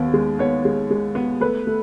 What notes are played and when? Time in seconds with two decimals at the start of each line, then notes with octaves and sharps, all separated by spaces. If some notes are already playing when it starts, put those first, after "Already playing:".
Already playing: D#2 B3
0.14 G#3
0.39 B3 C#5
0.65 G#3
0.91 G#3
1.15 B3
1.41 A3 B4
1.67 A3